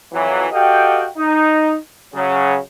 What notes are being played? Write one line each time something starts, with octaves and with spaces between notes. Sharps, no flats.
F2 E3 F#3
F#4 G4 A4 D#5 F5 G5
D#4
C#3 F#3